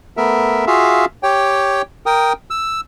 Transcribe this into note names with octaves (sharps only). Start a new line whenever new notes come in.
A3 B3 A#4 E5
F4 F#4 G#4 E5 F5
G4 C#5 G5
A#4 G5 D#6
E6